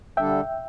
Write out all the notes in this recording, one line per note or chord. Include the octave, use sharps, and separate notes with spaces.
D3 G3 D4 A4 E5 G5